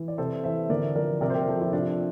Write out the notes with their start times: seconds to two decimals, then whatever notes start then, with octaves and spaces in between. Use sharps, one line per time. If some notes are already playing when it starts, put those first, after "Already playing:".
Already playing: E3
0.08 D5
0.18 C3 A4 C5
0.44 E3 C5 E5
0.70 D3 A#4 D5
0.96 F3 A#4 D5
1.21 C3 A#4 D5
1.30 C5
1.34 G4 A#4
1.48 F3 A4
1.60 E4 G4
1.72 C3 D4 F4